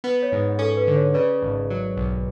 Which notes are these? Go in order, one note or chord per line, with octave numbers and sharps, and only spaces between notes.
B3 B4
C#5
G#2
C#4 A4
B4
D3
C#5
C#3 B4 D5
G#1
F#3
B1